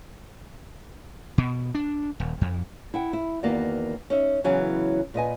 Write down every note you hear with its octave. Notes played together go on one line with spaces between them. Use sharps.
B2
D4
D#1
F2
E4 F#5 G5
E4
E2 D#3 A#3 B3 F#4 D5
C#4 D#4 E5
C#3 E3 F#3 B3 C#4
A#2 B4 D#5 G#5